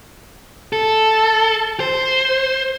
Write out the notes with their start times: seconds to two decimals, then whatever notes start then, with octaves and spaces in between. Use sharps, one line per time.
0.73 A4
1.80 C5